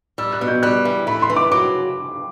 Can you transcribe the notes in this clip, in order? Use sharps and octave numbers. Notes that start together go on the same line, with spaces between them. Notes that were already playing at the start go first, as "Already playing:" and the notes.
G3 E6
F#6
B2
G6
G3 F#6
E3
A3 B5
C6
E3
D6
F#3 D6